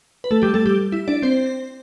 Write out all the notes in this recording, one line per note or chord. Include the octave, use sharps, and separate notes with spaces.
B4
A3 A4
G3 G4
A3 A4
G3 G4
E4
D4 D5
C4 C5